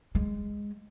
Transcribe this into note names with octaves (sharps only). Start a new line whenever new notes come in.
G#3